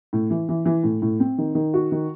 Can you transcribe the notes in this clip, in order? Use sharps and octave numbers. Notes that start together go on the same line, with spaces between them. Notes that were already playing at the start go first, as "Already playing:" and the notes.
A2
E3
E3
E3
A2
A2
C4
D#3
D#3
F#4
D#3